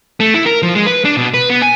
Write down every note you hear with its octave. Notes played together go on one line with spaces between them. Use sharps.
A3
E4
A#4
F3
G#3
B4
D4
B2
B4
B3
G#5